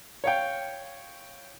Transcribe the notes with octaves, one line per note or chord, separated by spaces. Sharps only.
C#5 F5 G5